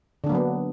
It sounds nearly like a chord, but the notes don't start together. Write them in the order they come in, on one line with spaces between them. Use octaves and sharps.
D3 D4 A#3 F#3 B3